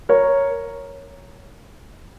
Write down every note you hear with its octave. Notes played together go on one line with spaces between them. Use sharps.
A#4 C#5